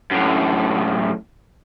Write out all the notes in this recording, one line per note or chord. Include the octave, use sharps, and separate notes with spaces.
F#2 A2